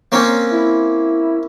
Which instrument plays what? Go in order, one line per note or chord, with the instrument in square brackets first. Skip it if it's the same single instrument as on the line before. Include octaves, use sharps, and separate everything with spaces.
[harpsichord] A#3 C4 C#4
[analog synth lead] E4